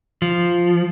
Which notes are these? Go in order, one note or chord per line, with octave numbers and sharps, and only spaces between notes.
F3